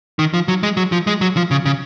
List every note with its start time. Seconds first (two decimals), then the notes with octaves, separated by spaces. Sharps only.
0.19 D#3
0.34 F3
0.48 F#3
0.63 G#3
0.77 F#3
0.92 F3
1.07 G#3
1.21 F#3
1.37 F3
1.51 C#3
1.66 C#3